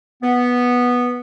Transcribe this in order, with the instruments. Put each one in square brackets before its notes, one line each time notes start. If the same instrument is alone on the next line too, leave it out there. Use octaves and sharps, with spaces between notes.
[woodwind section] B3